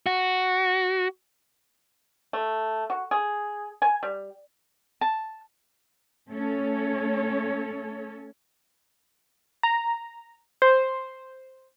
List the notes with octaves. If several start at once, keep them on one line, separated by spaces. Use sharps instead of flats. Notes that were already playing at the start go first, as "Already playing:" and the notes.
F#4
A3
F#4
G#4
G#5
G3
A5
A3 C#4 A4 C#5
A#5
C5